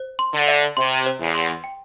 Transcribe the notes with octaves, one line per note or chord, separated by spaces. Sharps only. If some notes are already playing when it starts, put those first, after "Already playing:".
Already playing: C5
C6
D3
E5
C3 C6
C5
E2
C6
G5